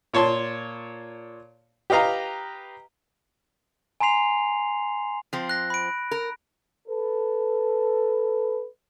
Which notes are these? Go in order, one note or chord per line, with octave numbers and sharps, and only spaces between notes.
A#2 C#5 A5 C6
G4 B4 D#5 F5 A#5
G#5 A#5 C6 C7 F7
F3 C4
F#6 A#6
B5 D7
A#4
A4 B4